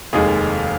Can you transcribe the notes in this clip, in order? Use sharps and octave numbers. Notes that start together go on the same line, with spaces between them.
F1 D#2 D#3 G#3 G#4